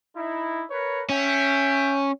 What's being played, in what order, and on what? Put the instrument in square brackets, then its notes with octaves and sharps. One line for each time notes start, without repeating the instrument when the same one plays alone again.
[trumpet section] D#4 E4
A#4 B4 C#5
[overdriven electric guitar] C#4 [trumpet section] C#5 E5 G5